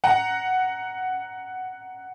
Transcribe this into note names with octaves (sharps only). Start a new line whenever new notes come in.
F#5 A#5